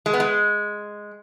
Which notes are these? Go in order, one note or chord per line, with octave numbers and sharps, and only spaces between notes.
G#3
B3
G#3